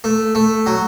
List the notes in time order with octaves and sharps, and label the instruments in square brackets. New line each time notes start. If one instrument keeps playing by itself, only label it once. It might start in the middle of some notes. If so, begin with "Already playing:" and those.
[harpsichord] A3
A3
F#3